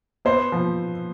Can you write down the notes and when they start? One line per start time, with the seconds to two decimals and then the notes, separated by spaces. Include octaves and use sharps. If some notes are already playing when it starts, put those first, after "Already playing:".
0.25 B3 C5
0.52 F3